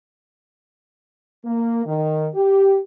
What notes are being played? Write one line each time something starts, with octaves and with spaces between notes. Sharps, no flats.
A#3
D#3
G4